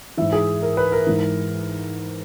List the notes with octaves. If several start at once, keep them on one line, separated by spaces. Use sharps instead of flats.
G#2 E3 E5
G#4
A#4
B4
A#4
G#2 E3